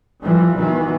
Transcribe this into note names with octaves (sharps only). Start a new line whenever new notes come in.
E3 F3 G3
B2 D#3 E3